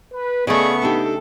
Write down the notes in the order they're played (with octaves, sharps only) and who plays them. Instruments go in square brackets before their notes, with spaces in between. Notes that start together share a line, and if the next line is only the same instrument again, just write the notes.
[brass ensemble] B4
[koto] C#3 A3 [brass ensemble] B3 [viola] G#4 C#6 [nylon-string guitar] D5 D#5
[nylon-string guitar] D4 D#4 G4 [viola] A4